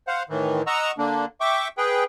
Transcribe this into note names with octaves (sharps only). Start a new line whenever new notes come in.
C5 F5 F#5
A2 D#3 E3
D#5 F#5 A#5 C#6 E6
D3 A#3 D4
E5 G5 C#6 D6
G#4 B4 G5